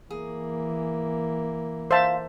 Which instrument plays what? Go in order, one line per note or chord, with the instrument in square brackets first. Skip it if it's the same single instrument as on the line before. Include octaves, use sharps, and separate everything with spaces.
[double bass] E3 A#3 [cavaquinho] G#4
[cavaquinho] F4 [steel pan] C5 E5 A5